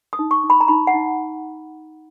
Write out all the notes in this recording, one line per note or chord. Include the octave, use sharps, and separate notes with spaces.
D#6
D#4
C#6
D#4
B5
A#5
D#4 B5
F#5
D#4